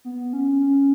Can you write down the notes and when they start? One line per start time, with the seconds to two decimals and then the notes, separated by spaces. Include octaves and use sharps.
0.05 B3
0.33 C#4
0.60 C#4